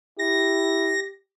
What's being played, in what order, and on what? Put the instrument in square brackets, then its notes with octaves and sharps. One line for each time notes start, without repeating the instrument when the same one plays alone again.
[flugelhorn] E4 [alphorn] G4 [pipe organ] A#6